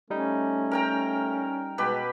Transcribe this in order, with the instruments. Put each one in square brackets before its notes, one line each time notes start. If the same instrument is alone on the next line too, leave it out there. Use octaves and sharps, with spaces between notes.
[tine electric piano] G3 D#4 [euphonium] A3 [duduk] C#4
[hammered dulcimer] A#4 G5 A#5
[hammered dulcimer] B2 G4 B4 [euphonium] G#3